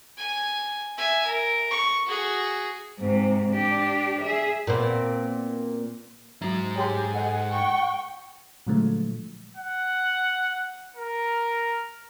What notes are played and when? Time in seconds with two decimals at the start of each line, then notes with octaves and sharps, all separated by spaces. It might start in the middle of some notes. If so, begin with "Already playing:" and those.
0.17 G#5
0.97 E5 G#5
1.26 A#4
1.71 C#6
2.06 F#4 G#4
2.98 G#2 C3
3.52 D4 G4
4.21 G#4 E5
4.67 A#2 B3 C4
6.41 G#2 F#3 F#4 A#5
6.76 G4 G#4 C#5 G5 G#5 C6
7.13 A4 D#5 F#5
7.51 G5 C#6
8.67 A#2 D3 F3 F#3 G#3 A3
9.57 F#5
10.96 A#4